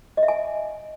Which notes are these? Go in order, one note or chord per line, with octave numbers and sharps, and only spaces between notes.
D#5
E5
G#5